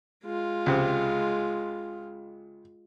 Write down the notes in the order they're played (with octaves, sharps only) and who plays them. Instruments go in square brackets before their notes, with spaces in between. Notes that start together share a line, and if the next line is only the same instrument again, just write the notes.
[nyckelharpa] G#3 F4
[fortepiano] C#2 C3